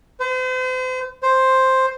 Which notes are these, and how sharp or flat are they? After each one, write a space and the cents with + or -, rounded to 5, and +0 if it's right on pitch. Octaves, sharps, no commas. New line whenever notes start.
C5 -40
C5 +5